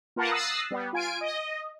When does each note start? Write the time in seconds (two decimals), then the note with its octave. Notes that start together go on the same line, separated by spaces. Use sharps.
0.16 A#3 F4 A#4 B4 F#5 A5
0.32 D#6 E6 F#6 A6 A#6 C7
0.71 G3 B3
0.93 F4 G#5 D7
1.21 D#5